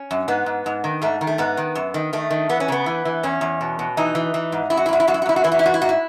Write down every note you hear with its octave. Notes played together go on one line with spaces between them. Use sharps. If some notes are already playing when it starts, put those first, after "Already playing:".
Already playing: C#4
F#2
G#2 B3
G#2
G#2
D#3
G#2 A3
D#3
A3
G#2 B3
D#3
F#2
D#3
D#3 A3
D#3
E3 B3
C#4
C#3 B3
E3
E3
E2 C#4
E2
B2
B2
E3 D#4
E3
E3
G#2
F#2 E4
F#4
E4
F#2 F#4
E4
F#2 F#4
E4
F#4
F#2 E4
F#4
E3 E4
F#4
E4
G#2 F#4
E4
G#2 F#4
E4